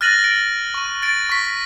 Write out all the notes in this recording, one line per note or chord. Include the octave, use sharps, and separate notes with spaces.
F6 F#6 A6 A#6 D#7 F#7
D7
C#6 D#7
A6 D7
C#6 B6